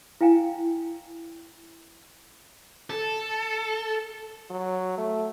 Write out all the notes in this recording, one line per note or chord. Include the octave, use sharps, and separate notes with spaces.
E4 F5 G5 G#5 A#5
A4
F#3
A3